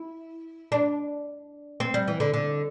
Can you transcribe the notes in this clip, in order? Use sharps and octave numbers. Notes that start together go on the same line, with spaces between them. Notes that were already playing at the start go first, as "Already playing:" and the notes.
Already playing: E4
D4
C4
G3
E3
D3
D3